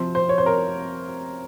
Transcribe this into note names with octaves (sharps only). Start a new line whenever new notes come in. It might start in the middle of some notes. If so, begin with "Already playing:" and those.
Already playing: C3 F3 C5
C5
C#5
C5
A#4